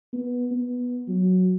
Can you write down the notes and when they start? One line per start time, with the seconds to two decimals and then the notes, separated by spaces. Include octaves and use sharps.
0.13 B3
0.51 B3
1.08 F#3